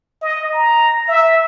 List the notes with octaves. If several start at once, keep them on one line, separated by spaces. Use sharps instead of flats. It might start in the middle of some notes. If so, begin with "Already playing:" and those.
D#5
A#5
E5